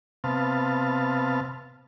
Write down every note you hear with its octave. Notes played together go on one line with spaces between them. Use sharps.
C3 B3 F5 A5